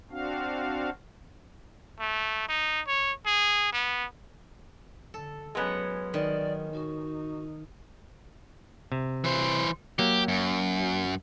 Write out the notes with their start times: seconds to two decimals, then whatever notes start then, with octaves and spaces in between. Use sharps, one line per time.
0.11 C4 D4 F#4 F5
2.00 A3
2.48 D#4
2.87 C#5
3.26 G#4
3.73 B3
5.14 D3 A4
5.55 F#3 G#3 B3 C#4
6.14 D#3 D5
6.73 D#4 F#4
8.92 C3
9.24 E3 C5
9.99 F#3 A#3 G4
10.28 F#2